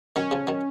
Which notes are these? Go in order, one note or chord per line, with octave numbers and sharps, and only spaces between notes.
D#3 F#3 C#4
C#3 F3
D#3 F#3